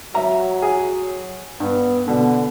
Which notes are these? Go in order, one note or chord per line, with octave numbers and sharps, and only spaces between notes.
F#3 E5 A#5
G#4
G2 B3
B2 D3